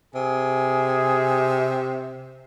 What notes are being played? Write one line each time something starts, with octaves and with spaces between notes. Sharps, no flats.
C3 G#4